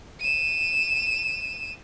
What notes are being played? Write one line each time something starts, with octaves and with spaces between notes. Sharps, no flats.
D#7 E7